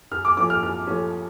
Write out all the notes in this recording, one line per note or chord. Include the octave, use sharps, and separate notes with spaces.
F#2 F6
D6
F3 A3 C#4 D6
F6
F#2 F6
F3 A3 C#4